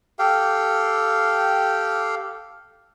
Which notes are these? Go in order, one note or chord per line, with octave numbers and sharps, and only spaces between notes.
G4 A4 F5 G5